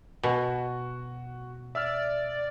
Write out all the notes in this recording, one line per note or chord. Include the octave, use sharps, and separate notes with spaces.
B2 F#4 G#5
D5 E5 E6 F6